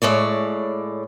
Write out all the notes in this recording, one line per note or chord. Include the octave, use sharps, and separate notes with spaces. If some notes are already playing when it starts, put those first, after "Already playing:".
A2 G#3 C#5 D5